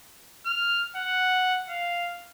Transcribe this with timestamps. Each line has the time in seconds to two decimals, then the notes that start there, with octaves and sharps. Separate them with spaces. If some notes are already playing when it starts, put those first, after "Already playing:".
0.46 F6
0.96 F#5
1.69 F5